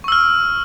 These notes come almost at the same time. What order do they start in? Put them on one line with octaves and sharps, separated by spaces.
C#6 E6 F6